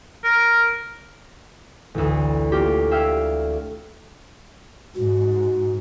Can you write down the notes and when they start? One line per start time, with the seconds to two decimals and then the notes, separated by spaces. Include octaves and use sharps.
0.24 A#4
1.94 A1 D2
2.52 A#3 F4 G4
2.91 E5 F5 G5 E6 F6 G#6
4.95 G#2 F#4